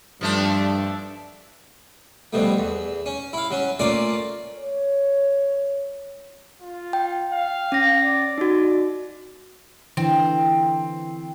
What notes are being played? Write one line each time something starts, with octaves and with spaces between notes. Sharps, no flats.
G2 F3 A3 D4
G2 B2 F3 A3
E2
C#4
E4 F5
F#3 C#4
A3 A#3 C#4 F4 D5 F5
C#5
F4
G5
F5
C#4 A#6
D5
D#4 F#4
D3 E3 C4